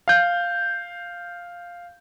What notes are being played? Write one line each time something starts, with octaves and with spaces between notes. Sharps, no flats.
F5 G6